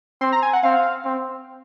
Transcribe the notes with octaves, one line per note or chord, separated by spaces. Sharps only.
C4 C6
A#5
G#5
F#5
C4 F5
C4